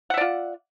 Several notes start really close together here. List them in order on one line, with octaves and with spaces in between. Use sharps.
F#5 E5 D5 F4